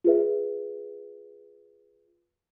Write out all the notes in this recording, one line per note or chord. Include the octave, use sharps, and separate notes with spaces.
F4 G#4 B4 E5